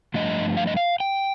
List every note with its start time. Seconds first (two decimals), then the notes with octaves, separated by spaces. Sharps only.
0.14 G2 F3 A3 D4 D#5
0.57 F5
0.67 D#5
0.77 F5
1.00 G5